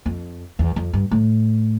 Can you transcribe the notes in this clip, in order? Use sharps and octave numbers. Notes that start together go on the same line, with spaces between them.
F2
E2
F2
G2
A2